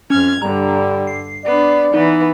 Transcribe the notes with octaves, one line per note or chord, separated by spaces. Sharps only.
F2 C#4 F6 G#6
G2 D3 G3 A#5
C7
B3 D4 D5
E3 B3 D#4